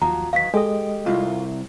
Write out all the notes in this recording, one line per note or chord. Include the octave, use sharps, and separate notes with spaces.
D#2 F3 F#3 A#5
D#3 E3 F#3 F5 B6
G#3 G4 A4 D#5
C2 F4